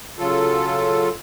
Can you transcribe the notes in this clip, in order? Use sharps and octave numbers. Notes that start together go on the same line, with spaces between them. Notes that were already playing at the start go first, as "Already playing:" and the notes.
C#3 F#3 F4 A4